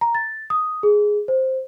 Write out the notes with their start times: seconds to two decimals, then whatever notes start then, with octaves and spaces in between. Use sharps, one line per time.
0.01 A#5
0.15 A6
0.50 D#6
0.83 G#4
1.28 C5